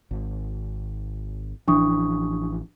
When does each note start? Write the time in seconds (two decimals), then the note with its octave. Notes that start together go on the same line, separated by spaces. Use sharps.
0.11 G#1
1.68 A1 E3 F3 D4 C#6 D#6